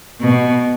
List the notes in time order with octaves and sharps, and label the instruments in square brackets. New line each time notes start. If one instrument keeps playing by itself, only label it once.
[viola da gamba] B2